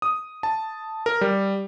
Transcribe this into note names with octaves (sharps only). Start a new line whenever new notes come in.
D#6
A5
A#4
G3